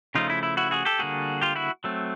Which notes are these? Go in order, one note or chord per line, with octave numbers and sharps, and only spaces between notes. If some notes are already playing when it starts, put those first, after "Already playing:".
C#3 F3 A3 C#4 D#4 F4
E4
E4
E4 F#4
F#4 G#4
G4 A4
D3 G3 A#3 F#4 G#4
F4 G4
E4 F#4
F#3 A3 C4